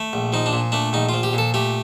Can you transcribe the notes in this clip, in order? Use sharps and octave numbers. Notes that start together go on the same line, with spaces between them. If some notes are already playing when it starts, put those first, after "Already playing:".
Already playing: A3
A#1
F3 D#4
D4
A#2
A3 D4
A#1 D#4
F3 F4
G4
A#2 A4
A3 G4